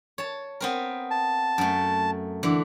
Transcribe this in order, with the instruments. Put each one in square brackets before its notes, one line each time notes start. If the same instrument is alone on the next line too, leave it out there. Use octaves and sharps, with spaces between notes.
[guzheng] C#5 A5
B3 C4 A#4
[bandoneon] A5
[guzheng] F#2 A3
D3 E3